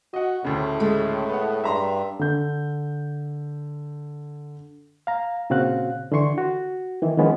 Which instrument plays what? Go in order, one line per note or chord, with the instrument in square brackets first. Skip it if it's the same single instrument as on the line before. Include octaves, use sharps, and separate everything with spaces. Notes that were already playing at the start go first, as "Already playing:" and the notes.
[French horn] F#4 [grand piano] D#5 F#5
[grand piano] D2 C#3 [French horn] A2
[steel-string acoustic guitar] G#3 A3
[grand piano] B3 F#5
[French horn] G2 [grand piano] E5 A#5 C6
[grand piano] D3 G6
[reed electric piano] F5 A#5
A#2 C#3 C4 F#4 F5 F#6
D3 E3 C6 C#6
F#4
D#3 E3
D#3 F3 G#3 B3 C#4 F4